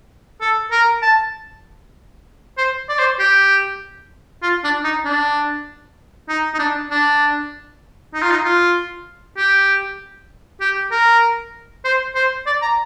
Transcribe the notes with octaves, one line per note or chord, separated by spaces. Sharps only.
A4
A#4
A5
C5
D5
C5
G4
F4
D4
D#4
D4
D#4
D#4
D4
D4
D#4
F4
D#4
F4
G4
G4
A#4
C5
C5
D5
A#5